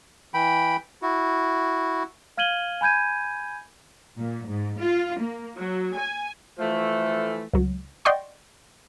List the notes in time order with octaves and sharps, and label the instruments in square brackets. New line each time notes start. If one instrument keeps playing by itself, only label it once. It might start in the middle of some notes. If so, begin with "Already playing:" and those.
[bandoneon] E3 G5 B5
E4 F#4
[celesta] F5 F6 G#6 D#7 F#7 G7
G#5 B5 G6 G#6 D#7
[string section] A#2
G#2
F4
A#3
F#3
G#5
[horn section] E3 F3 A3
[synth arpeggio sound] C#2 F#3
D5 D#5 F#5 G5 C6 C#6